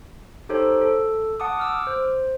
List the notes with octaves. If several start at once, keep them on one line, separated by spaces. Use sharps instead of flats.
D#4 G4 A4 C5 C#5
A4
F#5 A5 D6 D#6
D6 E6 F6
C5